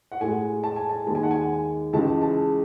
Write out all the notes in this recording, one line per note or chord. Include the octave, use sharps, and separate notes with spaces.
F#5
A2 G#3 G#5
A5
G#5
A5
D#2 D#3 G#3 A5
G#5
F#5
G#5
C#2 C#3 E3 G#3 A5
A5